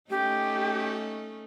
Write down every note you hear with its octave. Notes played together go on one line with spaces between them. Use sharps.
A3 C#4 D#4 G4